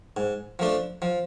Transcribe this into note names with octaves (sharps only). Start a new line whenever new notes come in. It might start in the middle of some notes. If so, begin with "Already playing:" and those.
G#2
F3 A3 D4
F3